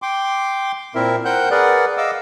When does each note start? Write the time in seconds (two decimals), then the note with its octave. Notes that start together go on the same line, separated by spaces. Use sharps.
0.02 G5 C6 D6
0.95 A#2 C4 E4 A#4 E5
1.25 A#4 C5 F#5 G5 F#6 G6
1.51 G#4 A#4 B4 D5 F#5
1.97 D#5 F5 D6 E6